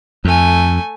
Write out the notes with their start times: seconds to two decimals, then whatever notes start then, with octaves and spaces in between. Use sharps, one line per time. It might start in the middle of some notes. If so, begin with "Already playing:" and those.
0.25 F2 A3 G#5